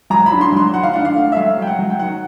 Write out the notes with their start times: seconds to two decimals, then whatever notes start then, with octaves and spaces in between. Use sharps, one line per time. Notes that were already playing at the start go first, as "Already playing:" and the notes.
0.10 F#3 A#5
0.26 B5
0.32 D4
0.41 C6
0.52 F#3 C6
0.73 D#3 F#5
0.83 F5
0.93 D4 F#5
1.05 F5
1.15 A3
1.32 E5
1.36 F#3 F5
1.58 F#3 G5
1.67 F#5
1.79 F#3
1.90 G5
1.99 D#3 F#5